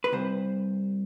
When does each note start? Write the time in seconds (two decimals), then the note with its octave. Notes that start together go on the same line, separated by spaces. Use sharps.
0.04 B4
0.12 C2 C3 C5